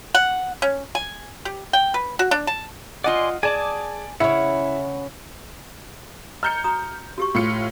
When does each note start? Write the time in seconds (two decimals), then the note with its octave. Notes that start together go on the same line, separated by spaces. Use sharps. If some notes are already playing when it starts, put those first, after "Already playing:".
0.15 F#5
0.62 C#4
0.95 G#5
1.45 G4
1.73 G5
1.94 B4
2.19 F#4
2.31 D4
2.47 A5
3.04 F4 D5 D#5 F#5 G#5 C6
3.43 G#4 D5 G#5 A5 D6
4.20 C#3 C#4 E4 E5 F#5
6.43 D#5 A#5 F6 G6 C#7
6.64 F#4 A#5 D#6
7.18 F#4 G4 C#6
7.35 A2 F4 C#7